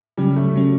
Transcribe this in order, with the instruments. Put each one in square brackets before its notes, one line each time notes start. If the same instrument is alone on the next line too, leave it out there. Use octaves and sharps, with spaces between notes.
[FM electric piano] C#3 F#3 C#4 [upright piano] G3
[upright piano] A3
[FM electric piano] C#3 F#3 C#4